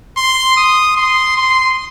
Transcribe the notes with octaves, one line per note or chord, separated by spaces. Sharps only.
C6
D#6
C6
C6